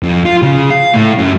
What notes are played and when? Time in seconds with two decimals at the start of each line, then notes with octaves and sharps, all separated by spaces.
0.03 F2
0.25 F4
0.42 C#3
0.70 F5
0.94 A2
1.19 F#2